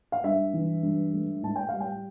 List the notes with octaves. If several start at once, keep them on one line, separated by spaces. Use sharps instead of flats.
F5
G2 E5
E3
G2
A3
A2 A5
G5
G3 F5
G5